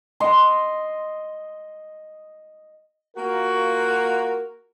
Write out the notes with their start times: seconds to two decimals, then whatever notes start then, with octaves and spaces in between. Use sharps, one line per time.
0.20 D#5 C6
3.17 A#3 F4 F#4 A#4